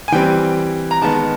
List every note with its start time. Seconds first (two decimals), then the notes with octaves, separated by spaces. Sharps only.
0.08 G#5
0.12 E3 G3 C4 G5
0.91 A#5
1.02 D#3 G#3 B3 A5